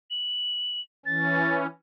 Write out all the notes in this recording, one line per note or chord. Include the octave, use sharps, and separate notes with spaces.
F#7
E3 C#4 A6